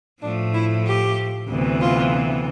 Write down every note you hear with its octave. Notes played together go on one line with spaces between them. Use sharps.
A2 F3 A3 D4
E4
G4
D2 C3 E3 B3
F4